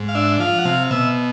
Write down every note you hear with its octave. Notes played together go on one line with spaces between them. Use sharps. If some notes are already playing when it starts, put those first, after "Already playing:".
Already playing: G#2
F5
D4 E5
F3 F5
F#5
C3 F5
B2 E5